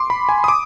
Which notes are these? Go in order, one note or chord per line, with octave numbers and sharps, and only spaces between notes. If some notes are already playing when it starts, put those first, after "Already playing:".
Already playing: C6 D6
B5
G#5
D#6
D6